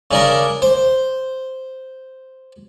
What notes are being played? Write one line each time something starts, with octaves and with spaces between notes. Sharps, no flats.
C#3 D4 A#4
C5